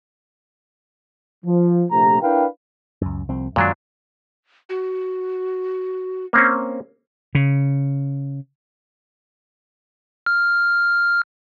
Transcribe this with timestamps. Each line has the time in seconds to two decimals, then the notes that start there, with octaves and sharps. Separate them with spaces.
1.45 F3
1.91 A#1 C3 A3 A#5
2.21 D4 E4 A#4 B4 F5 G5
3.01 C#2 F#2
3.29 C2 F3 C4
3.56 F#2 A#2 D#3 F#3 G#3 D4
4.69 F#4
6.33 A#3 C4 C#4
7.35 C#3
10.26 F6